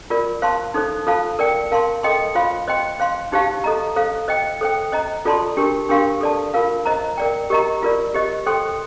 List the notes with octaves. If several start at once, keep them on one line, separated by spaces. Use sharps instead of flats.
F4 A#4 D5
C5 F5 A5 C6
D#4 A4 C5
F4 A4 C5 F5 A5
A#4 D5 G5
A#4 F5 A5 C6
A4 D#5 G5 C6
F4 C5 F5 C6
C5 D#5 G5 C6
C5 F5 C6
D#4 G4 C5 F5 A5
A4 D#5 A#5
A4 C5 F5
C5 D#5 G5
A4 C5 G5
C5 D#5 A#5
F4 A4 D5 A5 C6
D4 G4 A#4
D4 G4 A#4 F5 C6
A4 D5 A5
F4 A#4 F5
C5 D#5 A#5
A#4 D5 G5
G4 A#4 D#5 A#5
F4 A#4 D5
G4 C5 D#5
A4 C5 G5 C6